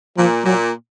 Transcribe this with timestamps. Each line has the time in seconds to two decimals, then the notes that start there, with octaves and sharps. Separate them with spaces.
0.17 A#2 F3
0.44 A#2 F#3